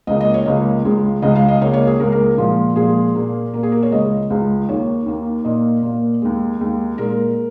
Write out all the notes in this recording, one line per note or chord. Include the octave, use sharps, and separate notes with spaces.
C#2 C#3 A#3 D#5
D#5
C#5
C#2 C#3 A#3 D#5
C#2 C#3 G#3
C#2 C#3 G#3 D#5
F5
D#5
C#2 C#3 A#3 C#5
C#5
G#4
C#2 C#3 A#3 A#4
A#4
A#2 F3 G#3
A#2 F3 G#3 G#4
A#2 A#3
A#2 A#3 A#4
G#4
A#4
C#5
C#2 C#3 G#3 D#5
C#2 C#3 G#3
D#2 D#3 A#3 C#5
D#2 D#3 A#3
A#2 A#3 D#5
A#2 A#3
D#2 D#3 G#3
D#2 D#3 G#3
A#2 G#3 A#4